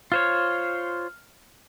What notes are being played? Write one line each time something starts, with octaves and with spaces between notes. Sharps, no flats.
F4 C5 C#5 F6